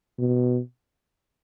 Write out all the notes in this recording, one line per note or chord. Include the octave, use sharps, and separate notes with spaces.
B2